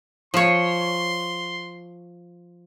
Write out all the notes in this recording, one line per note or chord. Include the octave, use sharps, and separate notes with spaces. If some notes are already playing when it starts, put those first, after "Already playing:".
F3 C#5 C6